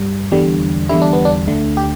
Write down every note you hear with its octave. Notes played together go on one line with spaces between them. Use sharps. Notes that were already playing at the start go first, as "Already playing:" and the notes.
Already playing: G2 G3
E2 D3 G3
E2 D3 G3 E4
D4
B3
D4
D2 D3 A3
G4